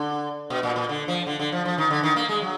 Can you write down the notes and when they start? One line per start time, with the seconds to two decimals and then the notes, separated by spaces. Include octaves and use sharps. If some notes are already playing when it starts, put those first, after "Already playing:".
Already playing: D3
0.50 B2
0.63 A#2
0.76 A#2
0.89 D3
1.08 F3
1.27 D3
1.39 D3
1.52 F3
1.65 F3
1.78 D#3
1.90 D3
2.03 D#3
2.16 A#3
2.29 G#3
2.42 F#3